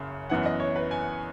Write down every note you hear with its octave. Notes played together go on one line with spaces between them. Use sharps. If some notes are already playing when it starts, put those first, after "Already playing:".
Already playing: F#1 F#2 C#3
F#2 E3 B3 F#5
D#5
C#5
B4
G#5